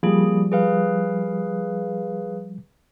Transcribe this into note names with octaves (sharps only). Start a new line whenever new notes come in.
F3 G3 A#3 G#4
G#4 B4 F5